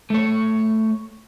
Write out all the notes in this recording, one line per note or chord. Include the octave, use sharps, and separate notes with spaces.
A3 C#5